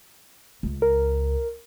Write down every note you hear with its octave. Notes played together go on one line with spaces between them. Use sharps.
C#2
A#4